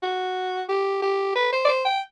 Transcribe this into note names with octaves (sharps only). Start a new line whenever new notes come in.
F#4
G4
G4
B4
C5
D5
C5
G5